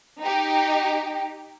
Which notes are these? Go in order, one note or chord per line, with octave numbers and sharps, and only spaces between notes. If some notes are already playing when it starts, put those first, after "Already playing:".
D#4 G4